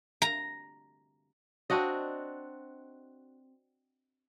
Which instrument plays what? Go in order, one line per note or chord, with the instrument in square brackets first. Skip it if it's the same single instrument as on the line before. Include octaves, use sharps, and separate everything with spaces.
[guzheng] A#5
[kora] C4 D4 F#4 D#5